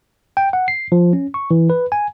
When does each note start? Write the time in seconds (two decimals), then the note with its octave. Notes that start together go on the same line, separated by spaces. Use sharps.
0.37 G5
0.53 F#5
0.68 C7
0.92 F3
1.13 C#4
1.34 C#6
1.51 E3
1.70 B4
1.92 G#5